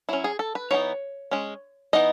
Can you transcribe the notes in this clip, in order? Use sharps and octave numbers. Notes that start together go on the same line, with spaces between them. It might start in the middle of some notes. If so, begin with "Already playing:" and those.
F#3 C#4 E4
G#4
A4
B4
E3 B3 D#4 C#5
G#3 C#4
E3 B3 D#4 D#5